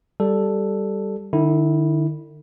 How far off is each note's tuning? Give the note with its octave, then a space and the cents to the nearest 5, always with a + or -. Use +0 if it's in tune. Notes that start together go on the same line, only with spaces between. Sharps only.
G3 +0 A4 +0
D3 +45 E4 -15